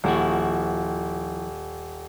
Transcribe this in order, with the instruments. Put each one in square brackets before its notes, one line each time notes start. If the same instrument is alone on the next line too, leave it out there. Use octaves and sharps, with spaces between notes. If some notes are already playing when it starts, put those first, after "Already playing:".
[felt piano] D#1 [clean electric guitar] F3 E4 F#4